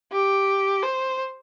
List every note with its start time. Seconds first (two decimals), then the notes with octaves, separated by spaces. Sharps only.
0.13 G4
0.83 C5